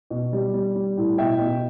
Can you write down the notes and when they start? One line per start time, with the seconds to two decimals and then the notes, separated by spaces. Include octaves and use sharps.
0.10 B2
0.33 G3
0.54 G3
0.75 G3
0.97 A2
1.18 B2 E5 G5
1.39 B2